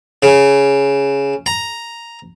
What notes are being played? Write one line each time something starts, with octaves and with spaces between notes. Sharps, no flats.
C#3
A#5